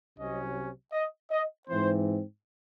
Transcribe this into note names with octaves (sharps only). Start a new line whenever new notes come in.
C2 C3 F#3 C#4 D#5
D#5
D#5
G#2 E3 C4 C5